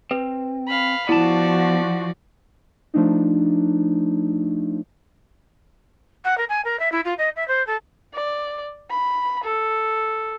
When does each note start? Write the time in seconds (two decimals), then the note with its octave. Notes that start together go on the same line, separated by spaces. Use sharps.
0.11 C4 B4
0.68 F5 B5
1.09 F3 B3 E4 F#4 D5 A5
2.94 F3 A3 D4 D#4
6.25 F#5
6.38 A#4
6.49 G#5
6.65 A#4
6.79 E5
6.92 E4
7.05 F4
7.18 D#5
7.36 E5
7.48 C5
7.67 A4
8.14 D5
8.90 B5
9.44 A4